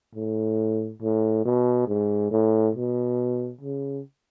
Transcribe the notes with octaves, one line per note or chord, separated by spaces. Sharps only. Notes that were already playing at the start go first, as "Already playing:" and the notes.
A2
A2
B2
G#2
A2
B2
C#3